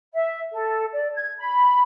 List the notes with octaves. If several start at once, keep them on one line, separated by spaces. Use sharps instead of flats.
E5
A4
D5
G#6
B5